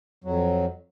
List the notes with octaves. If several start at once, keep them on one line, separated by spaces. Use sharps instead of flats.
F2 F#3